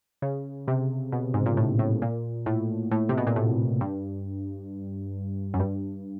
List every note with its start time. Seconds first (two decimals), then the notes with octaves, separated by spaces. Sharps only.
0.22 C#3
0.68 C3
1.12 B2
1.34 G#2
1.46 A#2
1.57 A2
1.79 A2
2.02 A#2
2.46 A2
2.91 A2
3.09 C3
3.17 B2
3.27 A#2
3.36 A2
3.81 G2
5.54 F#2
5.60 G2